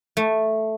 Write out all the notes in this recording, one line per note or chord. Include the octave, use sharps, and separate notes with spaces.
A3